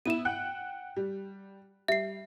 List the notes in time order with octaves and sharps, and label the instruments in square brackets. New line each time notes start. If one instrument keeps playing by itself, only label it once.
[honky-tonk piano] B3 E4 [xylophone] D#7 E7
[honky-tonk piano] F#5 G5 F#6
G3
[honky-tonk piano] G3 [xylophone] E5 C7